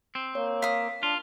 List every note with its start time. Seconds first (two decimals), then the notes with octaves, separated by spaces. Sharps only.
0.15 C4
0.35 A#3 C#5
0.62 F5 D#6 B6
1.03 D4 F4